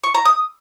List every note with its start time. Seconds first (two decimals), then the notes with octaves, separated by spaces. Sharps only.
0.04 C#6
0.14 A#5
0.25 D#6